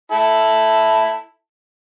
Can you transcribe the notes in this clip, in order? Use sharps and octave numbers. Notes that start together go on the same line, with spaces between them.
E4 A4